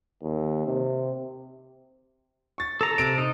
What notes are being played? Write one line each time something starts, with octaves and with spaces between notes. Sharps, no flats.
D#2
C3
C#6 A6
A4 A#5
C3 D7
D#4